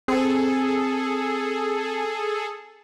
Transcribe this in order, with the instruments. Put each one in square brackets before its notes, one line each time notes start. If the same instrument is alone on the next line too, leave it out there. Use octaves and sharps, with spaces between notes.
[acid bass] C4 [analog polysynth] G#4 A4